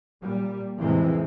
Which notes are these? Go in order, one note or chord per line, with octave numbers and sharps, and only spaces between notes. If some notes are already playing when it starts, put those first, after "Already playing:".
A#2 G3
F2 A2 C3 E3 G#3 C4